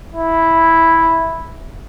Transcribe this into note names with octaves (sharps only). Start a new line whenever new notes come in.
E4